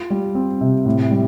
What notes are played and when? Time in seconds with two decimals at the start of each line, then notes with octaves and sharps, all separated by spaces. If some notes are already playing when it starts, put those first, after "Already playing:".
Already playing: F4
0.10 G3
0.35 C4
0.61 C3
0.86 A2
1.11 G3